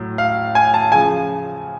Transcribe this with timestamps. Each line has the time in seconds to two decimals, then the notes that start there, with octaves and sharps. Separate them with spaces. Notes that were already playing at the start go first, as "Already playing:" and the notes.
Already playing: A2 F#3
0.18 F5
0.55 G#5
0.74 A5
0.92 C#3 F3 G#5